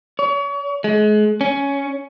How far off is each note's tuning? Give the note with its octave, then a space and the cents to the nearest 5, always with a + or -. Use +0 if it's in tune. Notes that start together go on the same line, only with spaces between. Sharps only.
C#5 +35
G#3 +35
C#4 +10